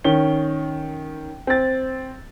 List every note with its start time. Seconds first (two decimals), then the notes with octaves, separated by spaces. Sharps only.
0.04 D#3 C#4 G7
1.47 C4 A6